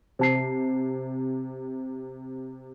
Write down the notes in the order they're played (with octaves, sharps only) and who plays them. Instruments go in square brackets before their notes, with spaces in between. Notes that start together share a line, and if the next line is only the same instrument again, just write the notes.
[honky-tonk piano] C3 [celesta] C5 A5 C7